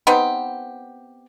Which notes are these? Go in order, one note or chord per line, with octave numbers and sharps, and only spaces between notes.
B3 C4 D#4 G4